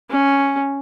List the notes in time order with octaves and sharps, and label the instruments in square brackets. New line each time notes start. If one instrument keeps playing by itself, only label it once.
[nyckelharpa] C#4